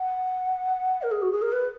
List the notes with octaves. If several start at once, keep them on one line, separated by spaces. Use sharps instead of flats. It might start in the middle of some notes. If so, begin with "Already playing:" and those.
Already playing: F#5
A#4
G#4
F#4
G#4
A#4
B4